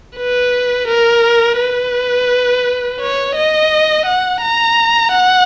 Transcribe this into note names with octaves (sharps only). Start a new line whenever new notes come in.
B4
A#4
B4
C#5
D#5
F#5
A#5
F#5